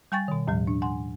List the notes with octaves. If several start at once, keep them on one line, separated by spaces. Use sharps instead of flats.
G3 G5 G#5 C#6 A6
B2 D#3
D#2 A2 F3 G3
D4
F#5 G#5 C6